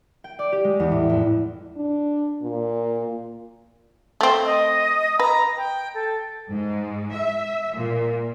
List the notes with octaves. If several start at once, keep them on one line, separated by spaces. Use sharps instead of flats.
G5
D5
G4
G#3
E2
A2
F2
D4
A#2
A3 C4
D#5
B4 A#5
G5
A4
G#2
E5
A#2